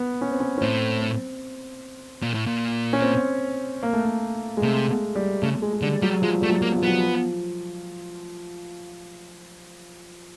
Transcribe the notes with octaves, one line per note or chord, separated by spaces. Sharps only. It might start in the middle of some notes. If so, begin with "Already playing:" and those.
Already playing: B3
C#4
C4
C#4
C#4
A2 C4
C4
A#2
A2
A#2
C#4
C4
A#3
A3
A#3
G#3
C3 A3
G3
C#3 A3
G#3
G#3
D3 G3
F#3 G3
F3 G#3
G3 A3
F#3
A#3
F3
F#3 B3
F3